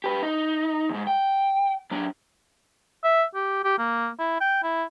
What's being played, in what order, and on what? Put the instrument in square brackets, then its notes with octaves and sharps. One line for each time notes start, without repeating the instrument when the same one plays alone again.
[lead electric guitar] G4 B4
D#4
E2 G#2
G5
F#3 D4
[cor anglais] E5
G4
G4
A#3
E4
G5
E4